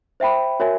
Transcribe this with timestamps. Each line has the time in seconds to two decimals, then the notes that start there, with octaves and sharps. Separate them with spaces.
0.20 C5 E5 G5 B5
0.60 F#4 A#4 C#5 E5 G#5